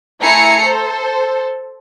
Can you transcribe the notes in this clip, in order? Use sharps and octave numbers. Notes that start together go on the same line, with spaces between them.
A3 E4 G#5 A#5 C7 C#7
A4 C5